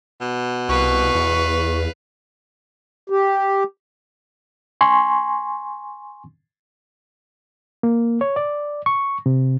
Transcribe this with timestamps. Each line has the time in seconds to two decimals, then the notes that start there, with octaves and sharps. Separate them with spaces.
0.21 B2
0.69 C2 B4 F5 C#6
1.15 E2
3.10 G4
4.81 G#5 C6 C#6
7.83 A#3
8.21 C#5
8.36 D5
8.86 C#6
9.26 C3